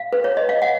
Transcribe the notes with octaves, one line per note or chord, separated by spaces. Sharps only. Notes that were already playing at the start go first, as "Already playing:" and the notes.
Already playing: F5
B4
C#5
D#5
F5
F#5